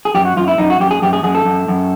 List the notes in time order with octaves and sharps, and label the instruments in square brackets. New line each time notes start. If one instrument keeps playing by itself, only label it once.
[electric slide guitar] G#4
F#2 G4
F#4
F#2 F4
E4
F#2 D#4
F#4
F#2 G4
G#4
F#2 G4
G#4
F#2 G#4
A4
F#2
F#2